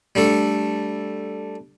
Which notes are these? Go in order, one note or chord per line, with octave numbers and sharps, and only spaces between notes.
G3 A3 D4 A4